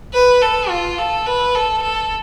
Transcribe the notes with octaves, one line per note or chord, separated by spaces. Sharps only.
B4
A4
F4
A4
B4
A4
A4